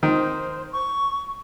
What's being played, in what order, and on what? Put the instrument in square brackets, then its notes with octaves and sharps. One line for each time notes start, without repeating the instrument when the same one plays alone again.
[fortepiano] D#3 [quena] C5
[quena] C#6